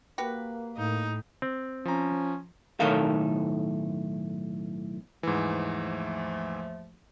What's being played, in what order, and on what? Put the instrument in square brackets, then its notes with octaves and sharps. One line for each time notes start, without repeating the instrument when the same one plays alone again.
[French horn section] A#3 [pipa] F#4 G4 B4
[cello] A2 [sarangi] D#4
[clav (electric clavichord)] C4
[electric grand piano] F3 A#5 [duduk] C#4
[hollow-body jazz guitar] B1 A2 D#3 A4 A#4 F5
[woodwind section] D#2 F3 A3 [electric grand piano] G#2 E3